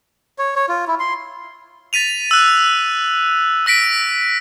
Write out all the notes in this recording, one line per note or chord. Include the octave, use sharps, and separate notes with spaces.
C#5
C#5
F4
E4
C6
A6 B6 D#7 F7
E6 F#6
E6 A#6 B6 D7